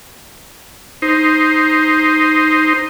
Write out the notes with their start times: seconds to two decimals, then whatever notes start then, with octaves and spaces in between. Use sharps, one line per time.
1.02 D#4 C5